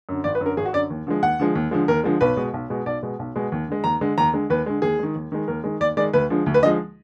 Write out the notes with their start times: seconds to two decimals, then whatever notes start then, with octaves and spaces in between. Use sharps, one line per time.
0.09 F#2 D3
0.24 G#1 D5
0.35 B4
0.41 F#2 D3
0.46 A#4
0.57 G#1 G#4
0.65 F#4
0.73 F#2 D3 D5
0.90 D#2
1.07 D3 F3 G#3
1.22 D#2 F#5
1.39 D3 F3 G#3
1.55 D#2
1.71 D3 F3 G#3
1.88 D#2 A#4
2.04 D3 F3 G#3
2.21 B1 B4
2.36 B2 G#3
2.54 B1
2.70 B2 G#3
2.86 B1 D5
3.03 B2 G#3
3.19 B1
3.36 B2 G#3
3.52 D#2
3.68 D3 G#3
3.84 D#2 A#5
4.01 D3 G#3
4.18 D#2 A#5
4.33 D3 G#3
4.50 D#2 B4
4.66 D3 G#3
4.82 D#2 G#4
4.99 D#3 G#3
5.16 D#2
5.32 D#3 G#3
5.48 D#2 A#4
5.64 D#3 G#3
5.80 D#2 D5
5.97 D#3 G#3 D5
6.13 D2 B4
6.30 D3 F3 G#3
6.46 D2
6.54 B4
6.62 D3 F3 G#3 D#5